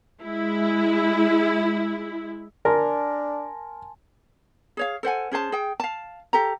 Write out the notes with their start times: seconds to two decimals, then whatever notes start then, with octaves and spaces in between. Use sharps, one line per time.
0.22 G#3 E4
2.65 D4 A#4 G#5 A5 C6
4.77 G#4 C#5 F5
5.03 A4 C5 F#5 G#5
5.31 C#4 G#4 C5 A5
5.52 G#4 G5
5.80 F5 A5
6.33 G4 A4 A#5